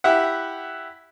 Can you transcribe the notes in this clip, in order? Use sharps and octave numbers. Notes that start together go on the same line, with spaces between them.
E4 G4 E5 F#5